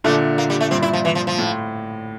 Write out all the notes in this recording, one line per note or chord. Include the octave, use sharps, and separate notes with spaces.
A#2 D3 A3
A#3
G3
A3
G2 A#2 C4
E4
F3
E3
F3
F3
A2